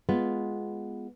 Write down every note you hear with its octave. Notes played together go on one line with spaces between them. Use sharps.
G#3 B3 F4